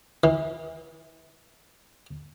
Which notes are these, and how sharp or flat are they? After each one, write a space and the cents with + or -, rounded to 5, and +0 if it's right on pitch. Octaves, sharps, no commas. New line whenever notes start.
E3 -30